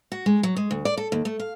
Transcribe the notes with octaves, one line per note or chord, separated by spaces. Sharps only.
F#4
G#3
F#3
G#3
D2
D5
A4
D#2
A3
F5